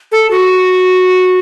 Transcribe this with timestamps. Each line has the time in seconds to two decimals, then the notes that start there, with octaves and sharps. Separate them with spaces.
0.12 A4
0.31 F#4